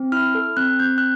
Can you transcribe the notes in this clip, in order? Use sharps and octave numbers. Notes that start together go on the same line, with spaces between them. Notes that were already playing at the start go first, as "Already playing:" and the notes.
Already playing: C4
E4 F6
A4
C4 F#6
C4 G6
F#6